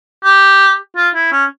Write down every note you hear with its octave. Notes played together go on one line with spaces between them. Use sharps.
G4
F4
E4
C#4